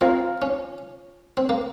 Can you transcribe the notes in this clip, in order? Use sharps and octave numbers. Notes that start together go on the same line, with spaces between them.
C4 F4 A#4 F5
C#4
C4
A#3